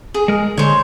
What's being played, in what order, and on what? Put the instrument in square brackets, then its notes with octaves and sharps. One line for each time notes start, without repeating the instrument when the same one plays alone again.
[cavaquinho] G#4
[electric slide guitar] G#3 A#4
[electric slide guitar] D3 G#3 [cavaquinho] C5 C#5